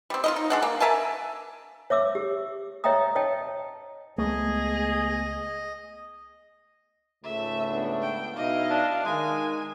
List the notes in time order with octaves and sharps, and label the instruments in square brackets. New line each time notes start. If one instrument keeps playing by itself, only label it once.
[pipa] G3 C4
F4 A#4 D#5
D#4
G#3 D4 F#5
A#3
A#4 E5 G#5 A5
[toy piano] C#5 E5 D6 E6
G4
C#5 D#5 E5 G5 A#5 D#6
C#5 D#5 G5 A5
[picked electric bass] C#2 G#3 [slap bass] A3 B3 [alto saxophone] G#4 [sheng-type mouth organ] D#5
[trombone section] C#2 G#2 A3 [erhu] E5
[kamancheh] B3 D4
[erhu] G5
[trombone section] B2 D#4 E4 [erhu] D#5 [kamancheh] F5
[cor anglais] D4
[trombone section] D#3 [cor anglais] G#3 [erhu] G#5